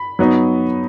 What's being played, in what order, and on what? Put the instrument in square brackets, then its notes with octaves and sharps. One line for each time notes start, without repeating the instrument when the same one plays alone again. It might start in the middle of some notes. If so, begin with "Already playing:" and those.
Already playing: [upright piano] B5
F#3 B3 D#4